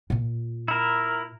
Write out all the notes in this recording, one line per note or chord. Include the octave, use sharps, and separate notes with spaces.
A#2 F4
E4 A#4